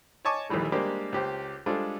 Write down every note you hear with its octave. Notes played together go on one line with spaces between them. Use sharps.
C#5 D#5 G#5 A5 C#6 D6
A#1 D#2 D#3 E3 G3 A3
G3 G#3 A#3 D4 G4 C5
C#2 G4 C5
G3 G#3 D4 F4 A4 C5